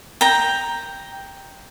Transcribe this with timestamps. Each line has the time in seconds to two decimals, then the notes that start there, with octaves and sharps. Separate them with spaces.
0.21 G5 A#5